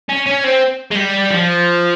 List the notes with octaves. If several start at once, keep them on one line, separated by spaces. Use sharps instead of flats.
C#4
C#4
C4
G#3
G3
F3